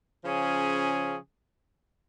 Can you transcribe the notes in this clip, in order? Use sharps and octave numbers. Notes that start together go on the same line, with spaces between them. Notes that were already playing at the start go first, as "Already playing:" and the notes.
C#3 F3 C#4 G#4